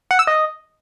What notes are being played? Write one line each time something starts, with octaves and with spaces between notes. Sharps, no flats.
F#5
E6
D#5